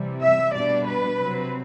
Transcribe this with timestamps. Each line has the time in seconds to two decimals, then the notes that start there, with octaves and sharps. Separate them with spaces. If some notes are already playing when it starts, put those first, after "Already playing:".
Already playing: C3 E3 G3
0.21 E5
0.54 B2 G3 D4 D5
0.86 B4
1.19 C3 F#3 C4